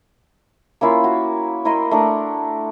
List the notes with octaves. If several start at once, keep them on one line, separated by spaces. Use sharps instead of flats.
A#3 C#4 E4 F4
F#4
E4 A#4 D#5 C6
A3 D4 A#4